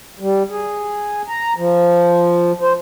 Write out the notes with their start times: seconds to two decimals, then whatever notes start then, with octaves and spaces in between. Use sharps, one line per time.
0.20 G3
0.50 G#4
1.28 A#5
1.57 F3
2.61 C5